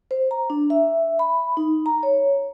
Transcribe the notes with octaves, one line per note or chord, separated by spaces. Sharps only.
C5
A#5
D4
E5
B5
D#4
A#5
C#5